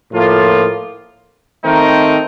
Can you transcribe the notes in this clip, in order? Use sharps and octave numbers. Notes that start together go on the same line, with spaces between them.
A2 F3 A#3 F4
D#3 A3 C4 D#4 A#4